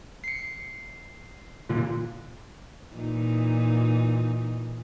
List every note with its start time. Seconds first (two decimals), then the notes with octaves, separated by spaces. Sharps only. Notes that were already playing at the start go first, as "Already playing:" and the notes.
0.24 C7 C#7
1.69 A#2 D3 E3 F4
2.94 A#2 E3 D#4